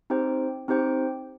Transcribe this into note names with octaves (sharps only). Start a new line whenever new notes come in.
C4 D#4 G4 C5 G5
C4 D#4 G4 C5 G5